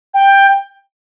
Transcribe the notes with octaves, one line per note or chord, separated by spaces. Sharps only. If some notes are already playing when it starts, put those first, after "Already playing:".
G5